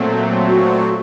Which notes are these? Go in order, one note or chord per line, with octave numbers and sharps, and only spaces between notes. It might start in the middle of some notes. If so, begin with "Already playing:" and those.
Already playing: A#2 F#3 A3 C4
F#4